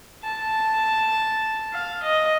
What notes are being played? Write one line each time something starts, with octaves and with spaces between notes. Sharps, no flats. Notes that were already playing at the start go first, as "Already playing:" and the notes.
A5
F5
D#5